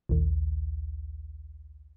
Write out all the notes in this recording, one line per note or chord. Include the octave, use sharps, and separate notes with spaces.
A#1 D#2